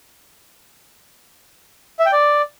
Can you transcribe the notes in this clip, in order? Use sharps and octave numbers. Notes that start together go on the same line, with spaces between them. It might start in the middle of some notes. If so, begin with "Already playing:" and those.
E5
G5
D5